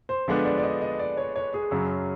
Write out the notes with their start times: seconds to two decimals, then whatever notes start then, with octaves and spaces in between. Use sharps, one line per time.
0.09 C5
0.28 D3 F3 G#3 B3 D4
0.45 D5
0.58 D5
0.63 D#5
0.81 D#5
0.99 D5
1.17 C#5
1.36 C#5
1.54 G#4
1.71 F#2 C#3 F#3